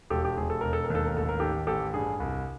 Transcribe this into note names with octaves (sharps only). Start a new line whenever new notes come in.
E1 G4 A4
G4
E1 G#4
A4
E1 A#4
A4
A#4
D#2
A4
A#4
A1 A4
A#4
D#3 G4 A4
A1 G4 A4
G2 G#4
C2